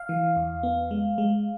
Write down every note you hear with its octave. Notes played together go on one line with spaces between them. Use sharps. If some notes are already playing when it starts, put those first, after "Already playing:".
Already playing: F5
E3
E2
B3
G#3
G#3